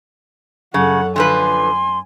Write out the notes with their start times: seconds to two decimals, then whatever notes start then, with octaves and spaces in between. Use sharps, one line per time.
0.74 F#2 C#3 A4 F#5 C#6
1.16 D3 F3 B4 G#5 C6